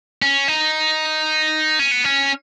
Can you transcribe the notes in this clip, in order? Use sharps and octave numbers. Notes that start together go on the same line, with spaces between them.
C#4
D#4
C#4
B3
C#4